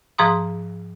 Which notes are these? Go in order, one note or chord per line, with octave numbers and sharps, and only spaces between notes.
G#2 F3 G#4 A#5 C6 D#6